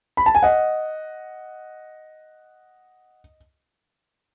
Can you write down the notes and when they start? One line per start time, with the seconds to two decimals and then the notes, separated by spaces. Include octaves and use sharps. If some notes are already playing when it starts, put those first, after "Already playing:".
0.17 B5
0.26 A5
0.35 G#5
0.43 D#5 F#5